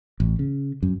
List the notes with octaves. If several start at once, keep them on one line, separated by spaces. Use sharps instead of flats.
A1
C#3
F#2